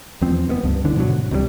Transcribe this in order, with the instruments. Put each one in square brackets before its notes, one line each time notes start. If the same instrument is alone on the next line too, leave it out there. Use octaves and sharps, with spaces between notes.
[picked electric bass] E2 F3 C4
F#1 A#2 B3
C#2 G2
C#2 D3 E3 D4
G#2 B2 D3 F#3
C#2 C3 D#3 G3